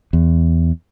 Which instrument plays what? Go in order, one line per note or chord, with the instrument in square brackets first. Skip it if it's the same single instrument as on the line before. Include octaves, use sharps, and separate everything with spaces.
[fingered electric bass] E2